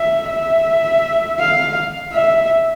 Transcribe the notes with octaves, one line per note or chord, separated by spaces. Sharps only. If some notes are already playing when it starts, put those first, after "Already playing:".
Already playing: E5
E5
F5
E5